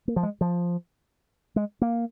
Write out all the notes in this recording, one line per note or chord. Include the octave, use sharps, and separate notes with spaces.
A#3
F3
G#3
F3
G#3
A#3